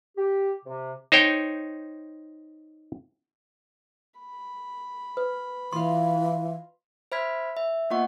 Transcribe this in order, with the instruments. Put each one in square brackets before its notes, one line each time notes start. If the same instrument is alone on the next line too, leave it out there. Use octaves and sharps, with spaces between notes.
[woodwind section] G4
C3
[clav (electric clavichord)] D#4 C5 C#5 G5
[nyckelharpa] B5
[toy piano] B4
[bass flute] E3 [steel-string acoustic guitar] F4 D#5 F5 [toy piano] C6
[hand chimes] C5 E5 B5 F6 G#6 B6
E5
A#3 B3 F4 D#5 F#5 C#6